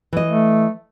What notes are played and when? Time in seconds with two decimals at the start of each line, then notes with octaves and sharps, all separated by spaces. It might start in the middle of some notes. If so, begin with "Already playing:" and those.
0.13 E3 D#5
0.27 A3